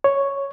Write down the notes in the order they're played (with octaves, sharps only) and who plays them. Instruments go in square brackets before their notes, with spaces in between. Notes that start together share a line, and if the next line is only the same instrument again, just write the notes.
[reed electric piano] C#5